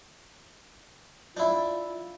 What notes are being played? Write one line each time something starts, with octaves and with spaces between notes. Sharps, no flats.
D4 E4 F4